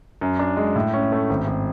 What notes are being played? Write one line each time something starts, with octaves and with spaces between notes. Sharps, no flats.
F#2
D4
G#3
A2
C#4
A3
G#1
G#1